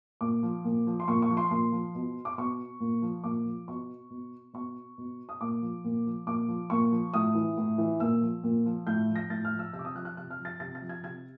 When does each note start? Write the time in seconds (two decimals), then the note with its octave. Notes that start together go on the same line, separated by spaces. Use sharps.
0.21 A#2 D6
0.43 F3
0.65 A#2
0.87 F3
1.00 C6
1.08 A#2 C#6
1.22 C#6
1.30 F3
1.37 C6
1.51 A#2 C6
1.72 F3
1.95 B2
2.25 D6
2.38 B2 C#6
2.80 A#2
3.02 F3
3.24 A#2 D6
3.45 F3
3.68 B2 C#6
4.10 B2
4.53 B2 C#6
4.98 B2
5.29 D#6
5.41 A#2 D6
5.62 F3
5.85 A#2
6.06 F3
6.27 A#2 D6
6.48 F3
6.70 A#2 C#6
6.92 F3
7.14 A2 D#6
7.35 E3
7.58 A2
7.78 E3
8.00 A#2 E6
8.22 F3
8.44 A#2
8.66 F3
8.87 A2 G6
9.09 F3
9.16 A#6
9.30 A2 A6
9.45 F6
9.52 F3
9.59 E6
9.73 C3 E6
9.79 D6
9.85 D#6
9.94 F3 F#6
10.05 F#6
10.17 C3 F#6
10.31 F6
10.39 F3
10.45 A6
10.60 C3 A6
10.75 A6
10.82 F3
10.89 G#6
11.03 C3 G#6